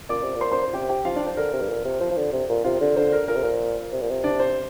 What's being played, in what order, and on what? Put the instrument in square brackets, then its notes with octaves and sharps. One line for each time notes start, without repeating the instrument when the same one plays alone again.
[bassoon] A#2 [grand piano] D5 D6
[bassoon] C3
A#2
[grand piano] C5 C6
C5 C6
C5
[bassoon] C3 [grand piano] G4 G5
[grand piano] G4 G5
[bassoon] F3 [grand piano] F4 F5
[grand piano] D4 D5
C5
[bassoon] D3 [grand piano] A#4
[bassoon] C3
G2
A#2
C3
[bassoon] F3 [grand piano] C5
[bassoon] F3
D3
C3
A#2
[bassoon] C3 [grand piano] F4 F5
[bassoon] D3
[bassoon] D3 [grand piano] C5
[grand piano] A#4
[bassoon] A#2 [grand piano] A#4
[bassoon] C3
[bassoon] A#2 [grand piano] C5
[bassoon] C3
A#2
C3
[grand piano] D4 D5
C5